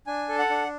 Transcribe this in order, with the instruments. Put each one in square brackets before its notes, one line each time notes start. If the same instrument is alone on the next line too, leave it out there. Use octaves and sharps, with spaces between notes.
[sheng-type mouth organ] D4 G#5
A4
F#5
D4